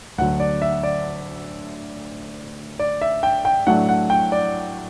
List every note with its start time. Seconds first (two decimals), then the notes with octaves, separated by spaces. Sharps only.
0.18 D2 D3 F#3 F#5
0.40 D5
0.62 E5
0.83 D5
2.79 D5
3.01 E5
3.23 G5
3.45 G5
3.67 A2 F#3 A3 D4 F#5
3.89 F#5
4.10 G5
4.32 D5